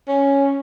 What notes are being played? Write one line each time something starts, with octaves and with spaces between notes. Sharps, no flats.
C#4